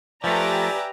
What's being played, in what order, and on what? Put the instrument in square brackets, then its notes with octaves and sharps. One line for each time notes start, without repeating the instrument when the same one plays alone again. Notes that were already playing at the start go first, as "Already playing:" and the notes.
[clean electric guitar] F3 A3 [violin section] G4 B4 A#5 [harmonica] D5 E5 G#5